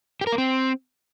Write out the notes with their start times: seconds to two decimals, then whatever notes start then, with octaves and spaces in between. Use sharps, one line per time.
0.21 G4
0.27 A#4
0.33 A#3
0.38 C4